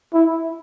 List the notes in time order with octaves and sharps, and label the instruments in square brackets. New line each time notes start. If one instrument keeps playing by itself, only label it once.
[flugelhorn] E4